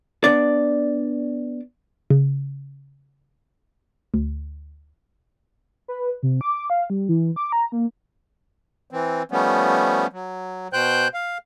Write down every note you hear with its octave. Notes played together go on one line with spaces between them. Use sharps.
B3 D4 D5
C#3
D2
B4
C3
D6
F5
G3
E3
D6
A#5
A#3
E3 C4
F3 G3 A3 B3 C#4
F#3
B2 C5 G5 F#6 G6
F5